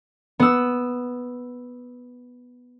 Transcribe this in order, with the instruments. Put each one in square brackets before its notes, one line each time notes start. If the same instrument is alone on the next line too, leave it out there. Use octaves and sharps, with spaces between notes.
[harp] B3 E6